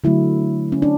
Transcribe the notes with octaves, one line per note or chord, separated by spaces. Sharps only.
D3 F#3 A3 E4
C#4
D4